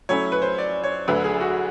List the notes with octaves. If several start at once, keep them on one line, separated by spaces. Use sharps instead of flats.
F#3 A3 C#4 E4 C#5
B4
C5
D5
C#5
D2 D3 F#3 B4
G#4
F#4